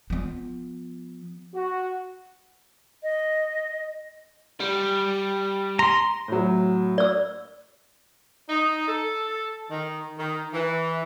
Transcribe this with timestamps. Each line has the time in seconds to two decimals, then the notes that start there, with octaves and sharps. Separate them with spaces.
0.10 F3 B3
1.54 F#4
3.03 D#5
4.60 G3
5.79 A#5 C6
6.28 A2 F#3
6.98 D5 E6
8.49 D#4
8.88 A4
9.70 D#3
10.18 D#3
10.53 E3